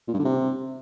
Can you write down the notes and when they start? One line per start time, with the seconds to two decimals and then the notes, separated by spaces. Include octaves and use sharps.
0.08 A#2
0.13 G2
0.19 D3
0.25 C3